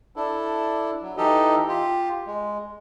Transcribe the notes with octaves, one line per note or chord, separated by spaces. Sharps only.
D4 E4 A4
F#3
E3 D#4 G4 A4 D#5
F4 G4
G#3